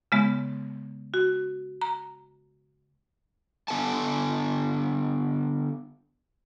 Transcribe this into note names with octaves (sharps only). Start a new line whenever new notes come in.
C#3 G#3 B3
F#4
A#5
D3 B3 A4 F#5 G#5 A5